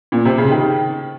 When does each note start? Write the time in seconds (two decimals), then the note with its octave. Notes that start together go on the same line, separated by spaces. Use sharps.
0.12 A#2
0.25 C3
0.38 C#3
0.50 D#3